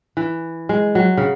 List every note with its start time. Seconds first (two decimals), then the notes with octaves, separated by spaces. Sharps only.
0.17 E3
0.69 G#3
0.95 F#3
1.17 C#3